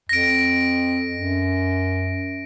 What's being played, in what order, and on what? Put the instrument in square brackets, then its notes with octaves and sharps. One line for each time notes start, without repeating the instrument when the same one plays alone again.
[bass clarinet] F2 [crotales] A#6 D7
[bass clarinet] F#2